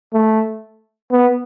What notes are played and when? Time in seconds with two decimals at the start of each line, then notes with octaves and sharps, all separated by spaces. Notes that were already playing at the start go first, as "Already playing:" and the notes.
0.13 A3
1.12 B3